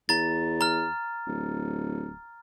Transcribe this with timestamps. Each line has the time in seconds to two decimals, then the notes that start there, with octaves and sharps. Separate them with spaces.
0.09 E2 A#5 A6
0.61 A#5 F6
1.27 D1